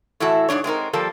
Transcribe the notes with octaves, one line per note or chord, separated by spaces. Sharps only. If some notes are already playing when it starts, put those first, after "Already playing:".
A2 E3 E4 F#4 A4
G#2 C3 D4 C#5
G#3 C4 D#4 A#4
F3 G3 A#3 A4